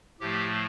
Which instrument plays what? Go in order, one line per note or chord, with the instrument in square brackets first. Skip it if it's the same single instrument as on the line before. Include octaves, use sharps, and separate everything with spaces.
[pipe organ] A2 F3 A3 G4